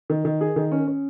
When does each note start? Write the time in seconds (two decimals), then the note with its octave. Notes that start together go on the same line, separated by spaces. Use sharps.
0.10 D#3
0.25 D#3
0.41 G#4
0.56 D#3
0.72 C#4
0.87 C#4